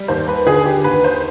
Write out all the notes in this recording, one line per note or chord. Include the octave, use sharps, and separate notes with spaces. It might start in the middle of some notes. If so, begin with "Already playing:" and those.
Already playing: G3
D#2 C5
B4
D3 G#4
G4
D#2 B4
C5